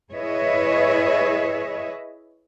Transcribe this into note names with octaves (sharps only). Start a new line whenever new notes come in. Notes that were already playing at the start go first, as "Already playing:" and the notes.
E4 G#4 B4 C#5 D#5 E5